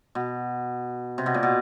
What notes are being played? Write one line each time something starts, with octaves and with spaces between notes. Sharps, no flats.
B2
C3
B2
A#2
B2